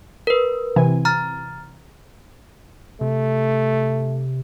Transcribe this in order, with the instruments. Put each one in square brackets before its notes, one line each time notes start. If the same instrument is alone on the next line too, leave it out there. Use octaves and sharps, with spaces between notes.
[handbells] A#4 B4
[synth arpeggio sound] C3 E3 G#5
[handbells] A#5 F6 A6
[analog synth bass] C3 [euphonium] A3